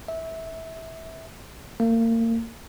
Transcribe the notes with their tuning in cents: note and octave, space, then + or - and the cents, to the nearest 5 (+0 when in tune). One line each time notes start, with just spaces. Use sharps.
E5 -20
A#3 -35